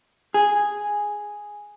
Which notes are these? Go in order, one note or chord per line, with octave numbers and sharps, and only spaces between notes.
G#4